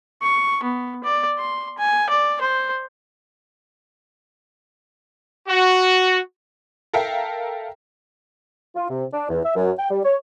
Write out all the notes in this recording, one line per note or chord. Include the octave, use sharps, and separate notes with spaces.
C#6
B3
D5
C6
G#5
D5
C5
F#4
A4 A#4 E5 F5 G5
F4
C3
D4
E2
E5
F#2
G5
G3
C#5